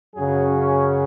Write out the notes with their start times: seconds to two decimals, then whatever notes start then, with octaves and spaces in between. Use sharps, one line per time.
0.15 F#2 C#3 F#3 G#4
0.56 C#4